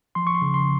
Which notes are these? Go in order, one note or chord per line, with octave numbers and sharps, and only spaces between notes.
F3 C6
C#6
C6
C#3
C6